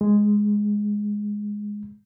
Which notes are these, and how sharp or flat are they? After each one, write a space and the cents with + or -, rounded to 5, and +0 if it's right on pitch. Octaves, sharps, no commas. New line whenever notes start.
G#3 +0